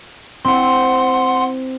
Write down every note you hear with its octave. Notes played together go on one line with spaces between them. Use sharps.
C4 E4 F#5 C6